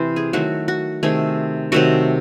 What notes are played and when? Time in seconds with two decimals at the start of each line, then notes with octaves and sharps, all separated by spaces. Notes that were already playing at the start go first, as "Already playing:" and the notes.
Already playing: C3 E3 C5
0.16 G#4
0.33 D#3 F#3 A3 F#4
0.68 F#4
1.03 C3 D#3 A3 G#4
1.72 C3 D#3 F#3 A3 F#4